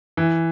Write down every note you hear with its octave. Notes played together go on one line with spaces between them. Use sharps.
E3